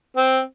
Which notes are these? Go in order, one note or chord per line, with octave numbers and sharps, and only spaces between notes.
C4